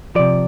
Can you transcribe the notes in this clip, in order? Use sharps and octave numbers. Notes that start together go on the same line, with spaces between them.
C3 F3 D5